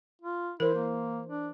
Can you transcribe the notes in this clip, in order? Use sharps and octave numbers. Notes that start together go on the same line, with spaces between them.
F4
E3 E4 A#4 C5
A#3
D4